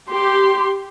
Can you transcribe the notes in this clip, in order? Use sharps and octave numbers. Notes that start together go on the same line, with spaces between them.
G4 C6